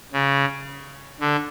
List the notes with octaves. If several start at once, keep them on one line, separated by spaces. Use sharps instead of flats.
C#3
D3